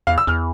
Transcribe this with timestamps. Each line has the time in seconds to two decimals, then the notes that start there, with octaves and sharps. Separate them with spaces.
0.07 E2 F5
0.18 E6
0.27 E2 F6